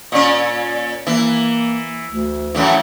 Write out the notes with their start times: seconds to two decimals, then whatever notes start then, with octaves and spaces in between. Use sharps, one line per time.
0.12 A#2 C#4
1.07 E3 A#3
2.08 D2
2.55 F#2 A2 E3